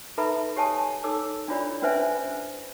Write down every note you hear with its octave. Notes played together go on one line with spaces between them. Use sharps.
D#4 A4 B4 E5 A#5 B5
G4 C#5 G#5 A5 D#6
D#4 A4 C#5 D6 E6
D4 E4 F4 C#5 D5 B5
C#4 D4 B4 C5 E5 G#5